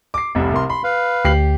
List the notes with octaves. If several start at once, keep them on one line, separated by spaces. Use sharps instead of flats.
D6 C7
F1 C2 E5
C2 A#4 C6
B5 C6
B4 F5
D2 G4 C7 F#7